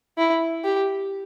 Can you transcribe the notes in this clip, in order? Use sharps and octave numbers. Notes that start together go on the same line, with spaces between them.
E4
G4